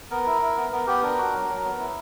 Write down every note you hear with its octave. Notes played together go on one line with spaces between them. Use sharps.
B3 A#4
E4
E4
B3
B3 A#4
B3 G4
D4 A#4
F#4
F#3
F#3
B3
E4